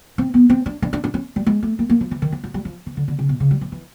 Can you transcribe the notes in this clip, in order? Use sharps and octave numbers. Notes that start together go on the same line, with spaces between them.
C4
B3
C4
D4
D4
D4
D4
C#4
G3
G#3
A3
A#3
A#3
F3
E3
D#3
F3
F#3
G3
F3
E3
D3
D3
C#3
B2
C#3
G3
F#3
E3